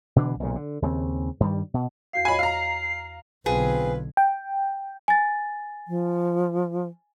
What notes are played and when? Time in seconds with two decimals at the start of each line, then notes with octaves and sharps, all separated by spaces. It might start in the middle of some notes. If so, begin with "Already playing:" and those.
0.16 B2 D3 E3 D4
0.40 B1 A#2 C#3
0.56 D3
0.82 D#2 C#3 A#3 C4
1.40 G2 D#3 G3
1.74 B2
2.13 E2 F#4 F5 C7
2.25 F#4 C#5 D#5 G#5 B5
2.39 F5 A#5
3.46 B1 D3 C4 F4 G#4 B4
4.17 G5
5.08 G#5 A6
5.88 F3